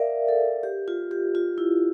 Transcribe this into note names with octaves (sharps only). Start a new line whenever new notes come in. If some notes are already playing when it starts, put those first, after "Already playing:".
Already playing: A#4 D5 E5 F5
A4
G4
F4
G4
F4
E4